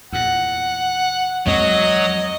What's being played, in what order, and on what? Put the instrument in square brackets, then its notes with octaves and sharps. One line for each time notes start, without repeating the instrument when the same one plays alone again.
[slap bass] E2 A#2 [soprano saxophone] F#5
[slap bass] E2 G#3 C4 [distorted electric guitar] F#3 [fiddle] D#5